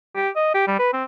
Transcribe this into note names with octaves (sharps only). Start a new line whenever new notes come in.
G4
D#5
G4
G3
B4
C4